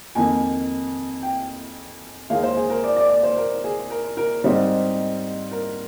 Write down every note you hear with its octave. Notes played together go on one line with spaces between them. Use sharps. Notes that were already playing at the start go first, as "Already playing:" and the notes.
F2 D#3 A#3 G#5
G5
D#2 D#3 G#3 F5
C5
G#4
A#4
D5
D5
D5
C5
A#4
G#4
A#4
A#4
G#2 G3 C4 D#4 C5
A#4